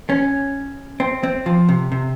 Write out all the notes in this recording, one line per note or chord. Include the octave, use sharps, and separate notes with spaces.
C#4
C4
C4
F3
C3
C3